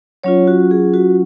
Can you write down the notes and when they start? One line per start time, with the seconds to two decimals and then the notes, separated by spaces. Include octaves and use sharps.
0.24 F#3 C#4 F4 C#5
0.47 F#4
0.71 G#4
0.94 F#4